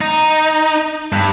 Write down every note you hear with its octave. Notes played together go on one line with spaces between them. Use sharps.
D#4
G2